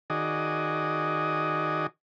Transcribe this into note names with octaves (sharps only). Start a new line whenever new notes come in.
D#3 F#4 G#4 D5 D#5